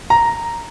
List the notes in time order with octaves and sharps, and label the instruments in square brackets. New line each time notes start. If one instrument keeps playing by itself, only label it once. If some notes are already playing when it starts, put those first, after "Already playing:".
[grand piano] A#5